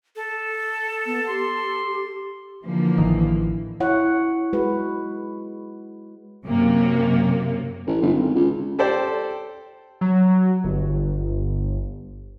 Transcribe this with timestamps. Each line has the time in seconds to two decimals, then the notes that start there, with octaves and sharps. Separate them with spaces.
0.16 A4
1.06 B3
1.28 G4 C6
2.65 D3 E3 F3 A#3
2.98 A1 D#3
3.80 E4 C#5 F#5
4.53 G#3 F#4 B4
6.45 F#2 C3 A#3
7.87 A1
8.02 G1
8.14 G#1
8.35 C#2
8.79 G4 A4 C5 D5 G5
10.01 F#3
10.64 G1